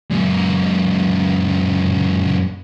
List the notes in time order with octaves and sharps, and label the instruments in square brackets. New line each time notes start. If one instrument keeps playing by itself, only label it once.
[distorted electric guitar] F#2 A#2